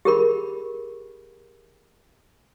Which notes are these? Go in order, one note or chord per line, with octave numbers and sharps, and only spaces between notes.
G4 G#4 A#4 B5